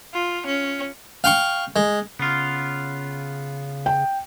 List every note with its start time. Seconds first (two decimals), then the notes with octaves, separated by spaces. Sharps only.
0.14 F4
0.46 C#4
1.24 F5 G5 C#6
1.76 G#3
2.19 C#3 B3 F4
3.86 G5